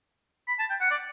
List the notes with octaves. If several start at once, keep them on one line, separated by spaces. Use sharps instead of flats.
B5
A5
G5
F#5
D5